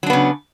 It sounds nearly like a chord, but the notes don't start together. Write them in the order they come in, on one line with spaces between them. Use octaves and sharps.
F#3 D4 B3 C#3